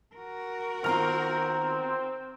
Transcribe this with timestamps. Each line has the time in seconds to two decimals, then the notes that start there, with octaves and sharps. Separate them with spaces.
0.15 F#4 A#4
0.84 D#3 B3 C4 F4 A#5 F6